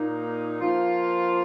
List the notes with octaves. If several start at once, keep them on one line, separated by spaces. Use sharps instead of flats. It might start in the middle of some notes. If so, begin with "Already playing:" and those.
Already playing: A#2 A#3 D#4
F3 A#3 F4